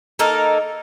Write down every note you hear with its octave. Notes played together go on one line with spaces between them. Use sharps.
A#3 D#4 A4 A#4